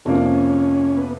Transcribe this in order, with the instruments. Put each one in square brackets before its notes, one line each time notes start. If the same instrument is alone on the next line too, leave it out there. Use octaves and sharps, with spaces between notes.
[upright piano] F2 C3 F3 A#3 [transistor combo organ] C#4
[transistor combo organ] D4
C#4
B3